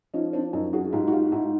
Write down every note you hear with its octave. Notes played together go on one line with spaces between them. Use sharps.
F3 C#4 D#4
C4 D4
F#2 C#4 D#4
F#4 G#4
G#2 F4 G4
F#4
F4 G4
G#2 E4 F#4